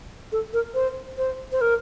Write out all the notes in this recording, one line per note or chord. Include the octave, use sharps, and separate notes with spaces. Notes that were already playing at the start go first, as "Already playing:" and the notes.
A4
A#4
C5
C5
C5
A#4